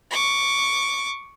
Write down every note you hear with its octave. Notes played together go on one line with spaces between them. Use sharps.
C#6 D6